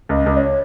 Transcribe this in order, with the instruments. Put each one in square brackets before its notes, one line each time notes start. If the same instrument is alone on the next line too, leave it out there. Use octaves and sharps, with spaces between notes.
[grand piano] C#2
[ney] D#5
[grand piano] C#2
[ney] C#5